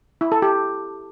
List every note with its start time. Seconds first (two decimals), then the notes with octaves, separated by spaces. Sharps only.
0.21 E4
0.32 A4
0.42 G4